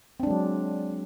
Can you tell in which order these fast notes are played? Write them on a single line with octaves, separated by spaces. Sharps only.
C4 D4 G#3 F#3